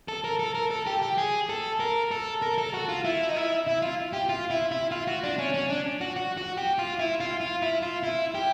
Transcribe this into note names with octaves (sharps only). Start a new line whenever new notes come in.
A4
A#4
A4
A#4
A4
G4
G4
G#4
A4
A#4
A4
A#4
A4
F#4
F4
E4
D#4
E4
E4
F4
G4
F4
E4
E4
F4
F#4
D4
C#4
C#4
D4
F#4
F#4
F#4
G4
F4
E4
F4
F4
E4
F4
E4
G4